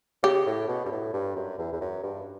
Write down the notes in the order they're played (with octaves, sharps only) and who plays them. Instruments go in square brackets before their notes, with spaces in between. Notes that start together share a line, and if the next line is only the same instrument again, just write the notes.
[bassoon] C#3 [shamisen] G4
[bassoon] A2
B2
G2
A2
G2
F#2
E2
E2
F#2
G2